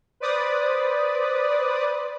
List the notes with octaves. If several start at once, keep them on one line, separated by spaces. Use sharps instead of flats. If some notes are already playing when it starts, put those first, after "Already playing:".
B4 C5 D5 D#6